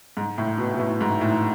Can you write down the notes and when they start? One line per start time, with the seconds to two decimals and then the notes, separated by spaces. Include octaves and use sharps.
0.17 G#2
0.38 A2
0.58 B2
0.74 B2
0.79 A2
1.01 G#2
1.21 A2